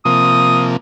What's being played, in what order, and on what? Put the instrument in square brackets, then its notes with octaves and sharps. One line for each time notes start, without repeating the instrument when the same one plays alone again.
[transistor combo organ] C3 F3 A#3 [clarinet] D#6